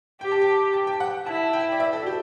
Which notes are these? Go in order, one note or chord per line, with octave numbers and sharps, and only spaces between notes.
G4 G5
A5
G5
A5
G5
F#5
E4 A5
G5
D5
E5
A4
F#4
G4